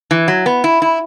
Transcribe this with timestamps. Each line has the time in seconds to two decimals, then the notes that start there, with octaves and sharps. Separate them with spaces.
0.11 E3
0.28 F#3
0.46 B3
0.64 E4
0.82 E4